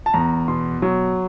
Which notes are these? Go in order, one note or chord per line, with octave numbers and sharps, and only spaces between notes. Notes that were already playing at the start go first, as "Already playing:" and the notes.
A5
E2 A#5
B2 C6
F#3